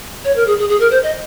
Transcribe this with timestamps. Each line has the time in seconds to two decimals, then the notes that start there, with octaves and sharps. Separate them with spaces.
0.25 C#5
0.36 A#4
0.47 G#4
0.59 G#4
0.69 G#4
0.80 A#4
0.91 C5
1.03 D#5